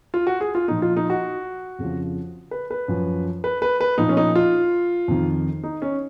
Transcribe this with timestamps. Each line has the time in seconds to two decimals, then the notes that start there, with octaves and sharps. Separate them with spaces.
0.14 F4
0.27 F#4
0.41 G#4
0.55 F4
0.68 A#2 F3 D#4
0.82 F4
0.96 D#4
1.10 F#4
1.79 F2 C#3 F3
2.51 B4
2.71 B4
2.88 F#2 F3
3.44 B4
3.62 B4
3.81 B4
3.98 A#2 F3 D#4
4.09 C#4
4.17 D#4
4.35 F4
5.08 F2 D#3
5.64 D#4
5.82 C#4